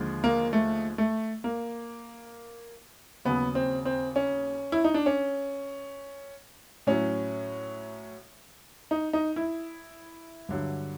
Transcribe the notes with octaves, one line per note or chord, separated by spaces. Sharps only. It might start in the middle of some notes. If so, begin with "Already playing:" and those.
Already playing: D#2 D3 F3 G#3
A#3
A3
A3
A#3
D#2 C#3 F#3 B3
C4
C4
C#4
E4
D#4
D4
C#4
A2 F#3 C#4
D#4
D#4
E4
G2 D3 F#3